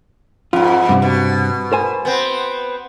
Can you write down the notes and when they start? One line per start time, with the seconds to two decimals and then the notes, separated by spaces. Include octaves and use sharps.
0.53 F2 G#2 F4
0.89 G2 C3
1.02 B2
1.72 A#4 C5 G#5
2.05 B3 C4